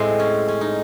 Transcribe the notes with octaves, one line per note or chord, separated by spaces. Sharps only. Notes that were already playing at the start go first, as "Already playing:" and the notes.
Already playing: A2 G#3 C4
C#4
C#4
D#4